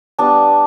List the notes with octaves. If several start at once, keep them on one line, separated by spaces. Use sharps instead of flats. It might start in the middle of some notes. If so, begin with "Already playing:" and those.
G3 B3 D4 A5